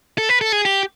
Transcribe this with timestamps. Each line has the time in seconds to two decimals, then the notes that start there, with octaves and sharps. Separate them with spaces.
0.18 A4
0.29 B4
0.41 A4
0.52 G#4
0.65 G4